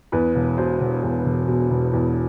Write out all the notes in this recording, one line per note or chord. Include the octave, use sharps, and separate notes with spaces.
E2 B4
E1
B2 C5
E1
E2
E1
B2
E1
E2